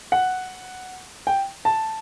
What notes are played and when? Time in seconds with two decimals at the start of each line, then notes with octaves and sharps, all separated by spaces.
0.12 F#5
1.27 G5
1.65 A5